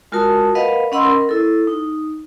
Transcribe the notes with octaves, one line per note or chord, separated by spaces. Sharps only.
G#3 F4 F#4 A#4 A5 D#6
A#4 B4 D#5 F5 F#5 B5
C#4 D#5 F#5 B5 C6 E6
A#4
E4 A4
D#4